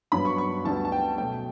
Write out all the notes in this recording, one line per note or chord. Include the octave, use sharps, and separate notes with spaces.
G2 F#3 B3 B5
C#6
C#6
D2 D3 G3 B3 A5
A5
G5
B2 F#3 A3 G5